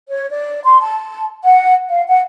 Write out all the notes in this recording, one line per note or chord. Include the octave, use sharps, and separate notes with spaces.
C#5
D5
C6
A5
F#5
F5
F#5